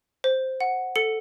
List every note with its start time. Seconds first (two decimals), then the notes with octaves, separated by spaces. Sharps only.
0.24 C5
0.60 F#5
0.96 A4 C#7